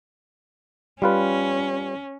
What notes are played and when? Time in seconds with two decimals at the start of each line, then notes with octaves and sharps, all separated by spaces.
1.02 G3 C#4 F4 B4